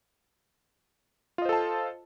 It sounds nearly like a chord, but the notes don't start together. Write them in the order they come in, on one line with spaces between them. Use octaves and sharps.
F4 D#5 C5 A4 A5